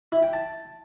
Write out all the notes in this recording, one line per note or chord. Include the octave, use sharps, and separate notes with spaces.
E4
G5
A5